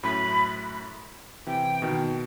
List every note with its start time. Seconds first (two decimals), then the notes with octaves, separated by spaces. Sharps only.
0.03 F#2 A2 B5
1.47 C3 E3 G5
1.82 B2 D#3